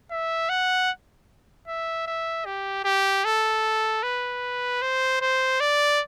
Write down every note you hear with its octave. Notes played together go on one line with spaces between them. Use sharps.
E5
F#5
E5
E5
G4
G4
A4
B4
C5
C5
D5